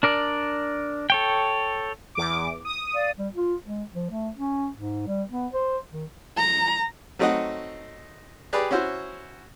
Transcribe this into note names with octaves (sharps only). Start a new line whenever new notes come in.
D4 A#4 D5
A4 C#5 G5
E2 D6
D#6
D5 F5
G3
F4
G#3
F3
A3
C#4
G#2
G3
B3
C5
D#3
A#5
F#3 A3 C4 D#4 D#5 F#5
G4 G#4 B4 D5
C#4 E4 F#4 C5